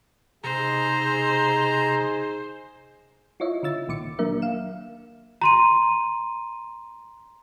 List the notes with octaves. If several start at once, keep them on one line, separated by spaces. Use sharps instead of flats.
C3 D#4 G#4 C5 A#5
E4 F4 C#5 D#5 E5
D3 F4 E6 A6
C#2 A#2 D#3 D6 C#7
F#3 A#3 D4 A#4 E5
F5 E7
A#5 C6 D#7